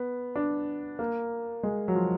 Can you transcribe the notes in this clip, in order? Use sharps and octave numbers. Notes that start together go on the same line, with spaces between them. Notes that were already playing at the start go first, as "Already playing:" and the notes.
Already playing: B3
D4
A#3
G#3
F#3
F3